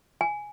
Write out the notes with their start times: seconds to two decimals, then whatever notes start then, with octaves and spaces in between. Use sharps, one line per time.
0.21 G#5